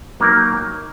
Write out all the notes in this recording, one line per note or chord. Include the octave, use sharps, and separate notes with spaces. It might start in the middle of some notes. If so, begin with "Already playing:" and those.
F#3 A#3 D#4 A#4